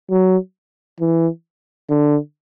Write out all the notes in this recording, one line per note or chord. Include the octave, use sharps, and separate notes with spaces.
F#3
E3
D3